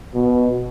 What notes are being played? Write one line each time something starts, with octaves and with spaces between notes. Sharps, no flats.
B2